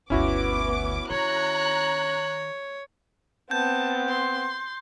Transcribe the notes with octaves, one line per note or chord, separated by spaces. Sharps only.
G1 D2 B3 C#4 E4 F#4 D6
D#3 C#5 A#5 F#6
B3 C4 A5 G6
C6